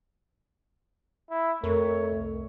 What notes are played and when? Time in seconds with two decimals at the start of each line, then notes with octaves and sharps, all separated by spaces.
1.30 E4
1.64 F2 A3 A#4 C#5
2.12 C2